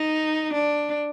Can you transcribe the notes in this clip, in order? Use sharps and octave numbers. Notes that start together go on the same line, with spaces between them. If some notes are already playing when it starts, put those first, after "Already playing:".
Already playing: D#4
D4